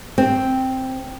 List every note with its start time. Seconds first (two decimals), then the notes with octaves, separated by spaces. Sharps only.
0.18 C4